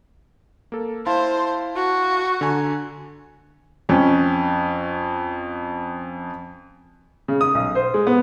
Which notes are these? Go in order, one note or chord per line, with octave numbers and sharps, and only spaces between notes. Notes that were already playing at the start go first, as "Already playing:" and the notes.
A#3 A4
E4 C5 F5 A5
F#4
D3 G#5 A#5
F2 C#4
C#3
D#6
B1
C5
G#3
B3